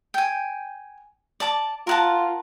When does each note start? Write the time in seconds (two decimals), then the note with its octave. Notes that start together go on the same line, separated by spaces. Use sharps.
0.14 G5 G#5
1.40 D5 A5 D6
1.87 F4 A#4 F#5 A5